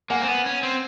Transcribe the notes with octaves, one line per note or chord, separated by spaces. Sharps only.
A#3 F#5 G#5
C4
B3
C#4
C4